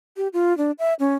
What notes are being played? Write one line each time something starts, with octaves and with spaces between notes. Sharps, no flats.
G4
F4
D4
E5
C#4